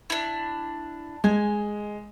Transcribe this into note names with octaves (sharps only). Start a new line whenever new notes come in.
D4 E4
G#3 G#5